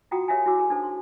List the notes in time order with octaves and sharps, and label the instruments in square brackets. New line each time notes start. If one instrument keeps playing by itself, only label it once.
[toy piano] F4 F#4 F#5 G5 A#5 D#6
G4 A#4 C#5 E5 F5 G#5
E4 F#4 G#5 D6 E6
G#4 A#4 G#5
D4 D#4 A4 C5
C6